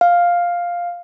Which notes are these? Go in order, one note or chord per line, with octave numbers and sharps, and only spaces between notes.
F5